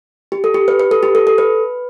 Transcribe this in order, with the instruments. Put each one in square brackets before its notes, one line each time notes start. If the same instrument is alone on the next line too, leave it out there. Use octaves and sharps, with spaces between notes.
[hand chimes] G4
A4
G4
B4
B4
A4
G4
A4
A4
B4